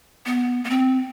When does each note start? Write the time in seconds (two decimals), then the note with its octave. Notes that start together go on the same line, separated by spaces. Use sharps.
0.26 B3
0.64 B3
0.70 C4